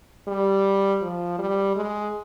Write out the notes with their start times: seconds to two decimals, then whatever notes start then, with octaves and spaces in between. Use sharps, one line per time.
0.28 G3
1.01 F3
1.39 G3
1.76 G#3